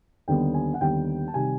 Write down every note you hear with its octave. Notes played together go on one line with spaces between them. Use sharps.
D#2 D3 G3 B3 G5
G#5
F#5
D#2 D3 G3 B3 G5
A5
C3 D#3 G3 G#5